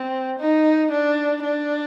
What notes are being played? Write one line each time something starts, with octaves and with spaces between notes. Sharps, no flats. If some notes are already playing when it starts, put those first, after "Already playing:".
Already playing: C4
D#4
D4
D4